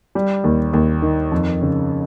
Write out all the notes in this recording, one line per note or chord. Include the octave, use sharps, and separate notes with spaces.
G3
D#2
D#2
D#3
F2
C#3